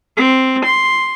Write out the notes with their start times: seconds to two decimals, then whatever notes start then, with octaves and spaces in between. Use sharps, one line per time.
0.17 C4
0.64 C6